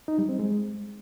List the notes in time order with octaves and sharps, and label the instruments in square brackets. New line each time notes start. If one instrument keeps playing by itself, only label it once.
[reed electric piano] D#4
G3
C4
G#3